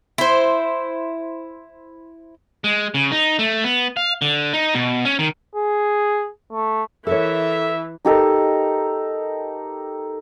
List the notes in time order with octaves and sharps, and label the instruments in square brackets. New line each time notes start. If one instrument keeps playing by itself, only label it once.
[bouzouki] E4 C5
[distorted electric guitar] G#3
C#3
D#4
A3
B3
F5
D3
D#4
B2
C#4
D#3
[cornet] G#4
A3
[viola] E3 [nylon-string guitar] A4 A#4 C#5 [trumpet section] E5
[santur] D#4 G4 A4 A#4